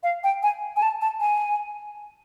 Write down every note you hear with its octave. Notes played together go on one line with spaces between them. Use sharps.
F5
G5
G#5
G#5
A5
A5
G#5